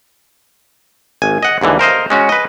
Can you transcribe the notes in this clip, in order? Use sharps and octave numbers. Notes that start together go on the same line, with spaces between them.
G#1 G#5
D#5 F#5
D#2 G#2 D3 E3
A#4 C5 D#5 F5
G#3 C#4 F#4
B4 D#5